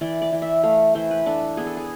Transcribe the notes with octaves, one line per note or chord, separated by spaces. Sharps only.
E3 D5
D5
E3
E5
A3 F5
E3 C5
B4
D4 A4
B3 G#4
A4
G#4